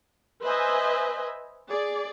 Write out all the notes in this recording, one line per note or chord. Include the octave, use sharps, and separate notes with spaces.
B4 C5 D#5 E5 G#5
G#4 D5